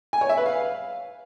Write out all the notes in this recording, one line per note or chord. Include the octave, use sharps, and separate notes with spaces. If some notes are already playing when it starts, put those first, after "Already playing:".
G#5
C#5
E5
B4
F5